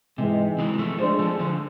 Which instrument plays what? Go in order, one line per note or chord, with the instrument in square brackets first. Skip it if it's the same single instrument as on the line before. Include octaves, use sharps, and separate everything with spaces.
[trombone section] G#2 E3 G#3 [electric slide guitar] C3
[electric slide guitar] E3 G#3
G#3
F3 A3
[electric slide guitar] F3 A3 [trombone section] G#3 D4 G#4 C5
[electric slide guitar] F3 A3
D3 F3